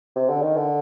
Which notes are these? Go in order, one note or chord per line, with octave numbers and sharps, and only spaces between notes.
C3
D3
D#3
D3